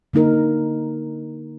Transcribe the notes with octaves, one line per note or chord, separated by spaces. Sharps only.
D3 A#3 D#4 A#4